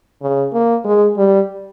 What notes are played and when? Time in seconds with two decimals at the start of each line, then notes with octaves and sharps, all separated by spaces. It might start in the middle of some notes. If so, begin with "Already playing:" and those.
0.22 C#3
0.53 A#3
0.84 G#3
1.17 G3